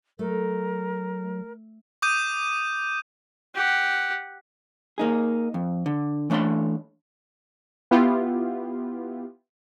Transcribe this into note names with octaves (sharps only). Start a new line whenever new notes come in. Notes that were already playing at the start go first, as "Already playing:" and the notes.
F#3 A3 A#4
D6 D#6 G6 D#7
G4 F#5
A#3 D#4 G#4
F2
D3
E3 A3 D4 C#5 B5 C6
B3 E4 F4 G4